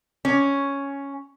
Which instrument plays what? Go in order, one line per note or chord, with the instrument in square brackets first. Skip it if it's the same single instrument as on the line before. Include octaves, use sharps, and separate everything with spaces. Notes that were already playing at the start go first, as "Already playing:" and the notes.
[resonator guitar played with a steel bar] C#4